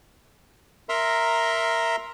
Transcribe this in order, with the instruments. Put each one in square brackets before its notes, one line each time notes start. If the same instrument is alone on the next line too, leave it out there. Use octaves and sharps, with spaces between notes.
[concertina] A#4 E5 A#5 C6